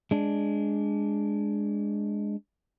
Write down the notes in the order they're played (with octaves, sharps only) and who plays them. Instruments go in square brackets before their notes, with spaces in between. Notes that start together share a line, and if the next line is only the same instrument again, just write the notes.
[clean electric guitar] G#3 D4